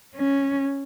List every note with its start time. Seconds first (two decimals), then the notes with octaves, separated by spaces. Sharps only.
0.16 C#4